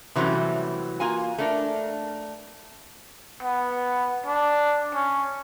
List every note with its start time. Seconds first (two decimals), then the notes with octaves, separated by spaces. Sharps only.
0.15 C3 E3 F#3 G3 A3 C#4
1.00 A#3 F4 F#4 G#5
1.38 A3 D4 A#4
3.43 B3
4.26 D4
4.94 C#4